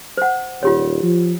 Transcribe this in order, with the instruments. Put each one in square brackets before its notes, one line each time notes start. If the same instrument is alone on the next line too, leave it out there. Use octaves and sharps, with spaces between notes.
[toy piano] C5 F#5
[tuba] D#1 [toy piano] F4 G4 C#5
[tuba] F3